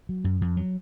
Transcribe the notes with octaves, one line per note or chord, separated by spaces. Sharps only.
F#3
F#2
F2
F#3